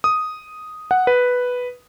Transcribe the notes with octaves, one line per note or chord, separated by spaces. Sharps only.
D#6
F#5
B4